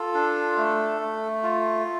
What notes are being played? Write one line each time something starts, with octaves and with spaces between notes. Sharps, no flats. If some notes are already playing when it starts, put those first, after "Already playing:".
Already playing: F4 A4
D4
A3
A3
F4